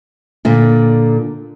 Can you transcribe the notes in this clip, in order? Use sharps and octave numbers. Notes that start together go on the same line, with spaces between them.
A#2 D3